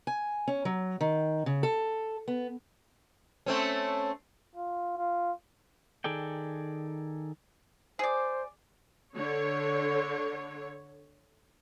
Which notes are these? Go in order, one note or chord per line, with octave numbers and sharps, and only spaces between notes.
G#5
C#4
F#3
D#3
C#3
A4
B3
A3 C4 C#4
F4
F4
D#3 G#4 A4 D5 G5
G#4 C5 D5
D3 C#5